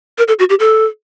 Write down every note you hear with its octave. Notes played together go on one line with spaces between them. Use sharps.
A#4
A4
F#4
G4
A4